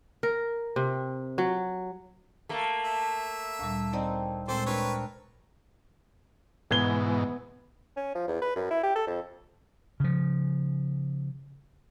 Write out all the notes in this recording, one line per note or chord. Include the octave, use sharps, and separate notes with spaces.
A#4
C3
F#3
A3 A#3
E5
D2 A#2 G3
C4 D#4 D5 D#5 G5
A#2 G#3 C4 A4 C5
D4 A#4 B4 C#5 D#5
G#2 B2 E3 B3 G#6 G7
C#4
F3
E2
B4
F#2
E4
G4
A4
F2
C#3 F3